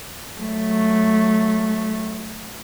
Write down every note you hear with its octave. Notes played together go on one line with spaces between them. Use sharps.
F#3 A3